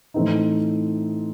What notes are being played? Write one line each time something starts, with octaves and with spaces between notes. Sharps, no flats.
A2 E3 A3 C4 D#4